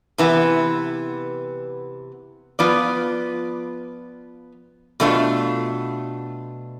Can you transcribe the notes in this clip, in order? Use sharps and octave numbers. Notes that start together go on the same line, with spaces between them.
C3 E3 B3
F3 B3 F4 B4 D5
B2 A3 D4 F4